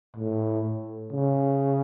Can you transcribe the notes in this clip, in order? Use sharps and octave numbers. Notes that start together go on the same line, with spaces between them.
A2
C#3